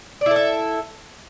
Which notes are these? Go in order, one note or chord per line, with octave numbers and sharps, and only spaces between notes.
E4 A4 D5 E5